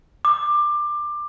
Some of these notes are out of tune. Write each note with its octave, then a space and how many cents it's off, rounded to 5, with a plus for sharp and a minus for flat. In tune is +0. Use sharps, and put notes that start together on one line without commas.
D6 +20